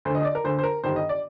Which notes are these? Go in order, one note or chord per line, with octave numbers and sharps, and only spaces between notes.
D2 D3 C5 D#5
D#5
D5
A#4
D2 D3 C5
C5
A#4
G1 G2 D#3 C5
D#5
D5